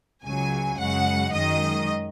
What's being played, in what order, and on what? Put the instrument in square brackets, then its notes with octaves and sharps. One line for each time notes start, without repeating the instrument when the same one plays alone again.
[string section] C#2 C#3 F#3 G#5
F#2 C#3 G#3 F#5
F#2 D#3 G#3 D#5